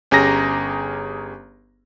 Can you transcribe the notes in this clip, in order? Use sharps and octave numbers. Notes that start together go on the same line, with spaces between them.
G1 C#4 G4 G#4 A#5 A#6